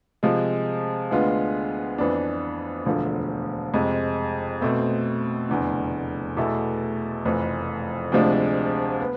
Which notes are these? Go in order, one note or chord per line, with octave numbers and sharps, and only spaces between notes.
C3 F3 G#3
D2 D3 G#3 B3 F4
F2 E3 B3 D4
E1 D2 D3 F3 A3
F2 C3 G#3
B2 A3 C4
F1 E2 D3
E2 B2 A3 E4 A4
F1 F2 E3
D2 C3 F3 G#3 D4
B3